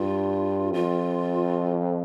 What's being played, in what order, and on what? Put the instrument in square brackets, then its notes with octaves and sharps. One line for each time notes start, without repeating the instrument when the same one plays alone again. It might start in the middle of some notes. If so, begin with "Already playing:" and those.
Already playing: [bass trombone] G2 [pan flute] F4
[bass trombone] F2 [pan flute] F4